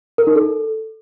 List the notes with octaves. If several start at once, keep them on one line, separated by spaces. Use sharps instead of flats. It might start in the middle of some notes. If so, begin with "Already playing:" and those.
A#4
D#4
A4